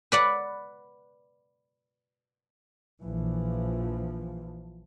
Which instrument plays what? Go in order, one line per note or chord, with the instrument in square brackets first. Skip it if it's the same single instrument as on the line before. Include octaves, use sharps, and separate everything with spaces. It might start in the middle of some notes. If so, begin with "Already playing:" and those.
[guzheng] B4 D5 F#5
[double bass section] A#1 E3 F3